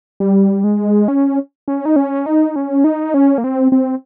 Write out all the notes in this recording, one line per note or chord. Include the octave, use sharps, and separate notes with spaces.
G3
G#3
C#4
C#4
D#4
C#4
D#4
C#4
D#4
C#4
A#3
C4
C4